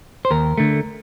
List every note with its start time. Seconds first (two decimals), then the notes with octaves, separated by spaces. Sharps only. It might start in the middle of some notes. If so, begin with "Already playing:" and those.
0.25 C5
0.31 D#2 A#4
0.58 D3 A3